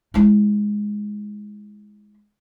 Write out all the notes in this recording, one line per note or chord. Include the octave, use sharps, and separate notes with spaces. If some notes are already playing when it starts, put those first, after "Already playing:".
G#3 E4